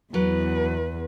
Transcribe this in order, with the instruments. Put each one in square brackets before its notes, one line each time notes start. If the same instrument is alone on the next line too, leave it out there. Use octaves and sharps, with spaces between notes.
[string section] E2 [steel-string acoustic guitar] F#3 [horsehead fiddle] B4